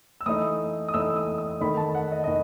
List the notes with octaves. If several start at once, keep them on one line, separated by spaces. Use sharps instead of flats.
E6
E3 A3 D#4 D#6
D#6
E3 A3 D#4 E6
D#6
D#6
D#3 A3 D#4 B5
A5
F#5
D#5
D#5
D#3